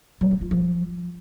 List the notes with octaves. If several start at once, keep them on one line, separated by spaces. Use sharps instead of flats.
F#3
F#3
F4
F3